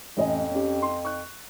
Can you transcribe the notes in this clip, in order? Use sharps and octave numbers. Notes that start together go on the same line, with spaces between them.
A1 F2 D#5 G#5
C#4 G4
C6
C#6 F#6